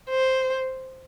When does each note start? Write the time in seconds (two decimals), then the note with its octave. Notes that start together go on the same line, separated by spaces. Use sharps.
0.10 C5